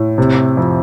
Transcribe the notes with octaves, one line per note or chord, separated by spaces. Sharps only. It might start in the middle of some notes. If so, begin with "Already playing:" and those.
Already playing: A2
C3
F2